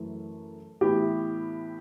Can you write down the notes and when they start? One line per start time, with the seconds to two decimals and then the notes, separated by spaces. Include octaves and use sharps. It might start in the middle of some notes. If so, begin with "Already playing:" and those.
Already playing: F#2 E3 A3
0.81 A2 E3 B3 E4 G4